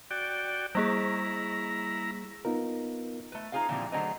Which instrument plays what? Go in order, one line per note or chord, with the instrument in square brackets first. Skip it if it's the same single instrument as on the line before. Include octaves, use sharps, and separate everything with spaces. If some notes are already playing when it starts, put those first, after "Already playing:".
[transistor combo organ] F#4 D5 G5
[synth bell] G3 A#3 G#4 [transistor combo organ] E4 A#5
[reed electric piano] B3 D#4 F4 A#4
[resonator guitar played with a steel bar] A3 B4
D#4 F4 G#4 C5 F5
A#2 D3 E3 F3 G3 C4
D3 F#3 A3 G#4 C5 D#5